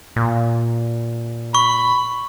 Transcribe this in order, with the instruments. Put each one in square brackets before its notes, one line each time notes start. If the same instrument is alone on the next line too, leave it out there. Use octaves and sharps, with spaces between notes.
[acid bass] A#2
[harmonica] B5 [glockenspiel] C#6